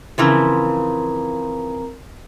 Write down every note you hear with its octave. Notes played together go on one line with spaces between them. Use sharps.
C#3 E3 F3 C4 A#4 A#5